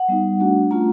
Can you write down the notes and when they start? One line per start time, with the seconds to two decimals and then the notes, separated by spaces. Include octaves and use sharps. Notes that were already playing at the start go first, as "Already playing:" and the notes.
Already playing: F#5
0.08 G3 B3 D#4
0.40 A3 D4 F#4
0.71 A3 C#4 F4 A#5